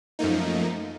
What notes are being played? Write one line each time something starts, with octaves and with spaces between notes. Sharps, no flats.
F#2 F3 A3 A#3 D#4